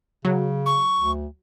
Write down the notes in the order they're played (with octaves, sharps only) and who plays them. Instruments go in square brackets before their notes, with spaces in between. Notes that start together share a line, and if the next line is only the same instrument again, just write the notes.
[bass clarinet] C#3 [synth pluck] F#3
[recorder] C#6
[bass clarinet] D2